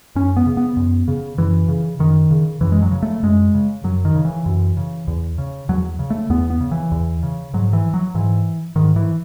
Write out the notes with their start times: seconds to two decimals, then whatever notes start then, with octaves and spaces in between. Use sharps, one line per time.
0.15 F#2 C#4
0.37 B3
0.46 C#3
0.57 B3
0.77 F#2
1.08 C#3
1.38 F#2 E3
1.69 C#3
1.99 F#2 D#3
2.31 C#3
2.61 F#2 E3
2.72 G#3
2.82 F#3
2.92 C#3
3.03 A3
3.23 F#2 G#3
3.54 C#3
3.84 F#2 F#3
4.05 D#3
4.15 C#3
4.25 E3
4.46 F#2
4.77 C#3
5.08 E2
5.38 C#3
5.69 E2 F#3
5.99 C#3
6.10 A3
6.30 E2 B3
6.50 B3
6.61 C#3
6.72 E3
6.92 E2
7.23 C#3
7.54 G#2 F#3
7.73 E3
7.94 F#3
8.15 G#2 E3
8.76 G#2 D#3
8.96 E3